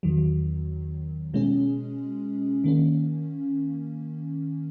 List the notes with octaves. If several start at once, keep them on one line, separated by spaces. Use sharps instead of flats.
E2 D#3 F#3
B2 G#3 C#4 G#4
D#3 A#3 C#4